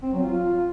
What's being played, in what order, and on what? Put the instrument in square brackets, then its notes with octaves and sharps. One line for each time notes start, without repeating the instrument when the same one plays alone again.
[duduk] C4
F#3
F4